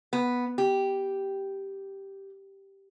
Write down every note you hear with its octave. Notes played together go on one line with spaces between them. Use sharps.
B3
G4